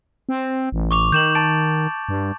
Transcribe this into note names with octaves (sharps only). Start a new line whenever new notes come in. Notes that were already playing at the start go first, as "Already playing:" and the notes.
C4
A1
C#6 D6 F7
D#3 G6 E7 F#7
A5 A6 D7
G2